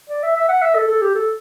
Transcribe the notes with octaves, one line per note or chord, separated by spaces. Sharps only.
D5
E5
E5
F#5
E5
A4
A4
G4
A4